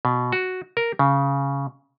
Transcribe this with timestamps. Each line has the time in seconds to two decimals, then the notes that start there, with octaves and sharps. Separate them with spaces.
0.05 B2
0.33 F#4
0.77 A#4
0.99 C#3